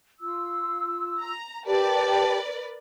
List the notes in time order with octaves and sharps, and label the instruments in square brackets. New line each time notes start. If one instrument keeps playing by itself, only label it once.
[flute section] F4 E6
[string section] A#5
[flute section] G4 G5 A5 [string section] A#4 B4 D5